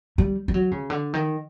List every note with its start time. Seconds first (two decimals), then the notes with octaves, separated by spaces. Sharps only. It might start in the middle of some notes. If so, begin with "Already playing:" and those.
0.18 G3
0.48 G3
0.54 F#3
0.71 C#3
0.90 D3
1.14 D#3